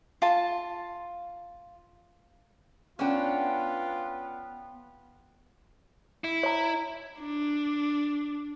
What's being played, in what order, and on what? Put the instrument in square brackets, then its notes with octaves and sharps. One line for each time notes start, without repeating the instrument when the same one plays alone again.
[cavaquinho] F4 A5
[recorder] B3 [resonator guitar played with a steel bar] C#4 D4 [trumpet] F4 [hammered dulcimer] F#5 G5
[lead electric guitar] E4
[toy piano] C#5 A#5
[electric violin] D4